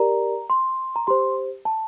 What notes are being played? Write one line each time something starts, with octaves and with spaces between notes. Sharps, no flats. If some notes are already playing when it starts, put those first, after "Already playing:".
Already playing: G4 A#4 D5 A#5
C6
A#5
G4 C5 C6
A5